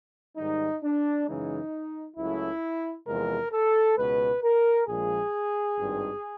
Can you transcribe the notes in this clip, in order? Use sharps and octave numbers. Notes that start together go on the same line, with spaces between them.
G#2 D#3 G3 D#4
D4
F#2 C#3 E3 G#3 D#4
C#2 C#3 F#3 A3 E4
E2 C3 F3 G#3 A#4
A4
C#2 B2 G#3 B4
A#4
A#1 A#2 F3 G#3 G#4
G#1 G2 D#3